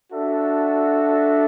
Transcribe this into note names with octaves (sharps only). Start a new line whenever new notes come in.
D4 F#4 A4 E5